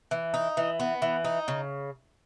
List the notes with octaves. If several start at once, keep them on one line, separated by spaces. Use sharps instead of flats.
E3
D#4
E3
B3
E3
D#4
C#3